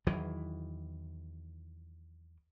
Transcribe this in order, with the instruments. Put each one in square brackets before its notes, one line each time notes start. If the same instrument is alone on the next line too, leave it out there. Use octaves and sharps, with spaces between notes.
[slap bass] E2 D#3 E3 F#3